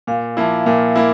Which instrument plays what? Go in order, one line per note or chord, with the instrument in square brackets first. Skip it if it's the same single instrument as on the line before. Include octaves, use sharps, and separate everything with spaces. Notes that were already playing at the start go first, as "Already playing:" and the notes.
[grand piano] A#2 [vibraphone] F5
[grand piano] F3 A#3 E4 [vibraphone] E5
[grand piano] A#2 [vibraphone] F5
[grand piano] A#3 E4